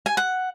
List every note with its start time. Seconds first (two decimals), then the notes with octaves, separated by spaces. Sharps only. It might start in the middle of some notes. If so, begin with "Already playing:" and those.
0.06 G#5
0.17 F#5